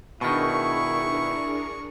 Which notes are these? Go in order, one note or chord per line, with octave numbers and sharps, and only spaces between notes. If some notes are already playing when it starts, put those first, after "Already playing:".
B2 D#3 D4 E4 G#4 A#4 C#6